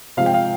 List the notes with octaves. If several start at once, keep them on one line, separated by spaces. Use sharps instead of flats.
C3 F3 G#3 F5
G5
F5